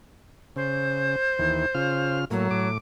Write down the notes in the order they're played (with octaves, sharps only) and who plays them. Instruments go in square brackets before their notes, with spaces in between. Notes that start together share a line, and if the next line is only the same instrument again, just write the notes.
[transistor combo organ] C#3 [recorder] C5
[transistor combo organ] D#2 E3
C#3 F4 F6
[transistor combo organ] A2 A#3 [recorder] F#3
[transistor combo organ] A2 D6